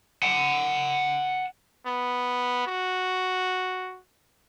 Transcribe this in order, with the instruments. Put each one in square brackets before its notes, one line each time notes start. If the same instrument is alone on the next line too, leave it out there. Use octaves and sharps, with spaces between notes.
[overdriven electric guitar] F#5 A5
[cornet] B3
F#4